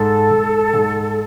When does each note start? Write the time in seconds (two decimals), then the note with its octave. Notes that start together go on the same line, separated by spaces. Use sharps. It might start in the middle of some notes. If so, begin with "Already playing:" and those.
Already playing: G#2 A4
0.31 G#2
0.74 G#2